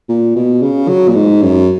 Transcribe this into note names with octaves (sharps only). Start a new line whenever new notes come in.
A#2
B2
C#3
F#3
A#2
G#2
F#2